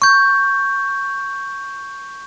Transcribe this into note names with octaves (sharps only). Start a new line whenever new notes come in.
C#6 G6